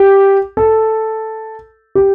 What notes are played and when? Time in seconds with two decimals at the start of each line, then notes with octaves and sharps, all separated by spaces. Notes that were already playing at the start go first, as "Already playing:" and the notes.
Already playing: G4
0.57 A4
1.95 G4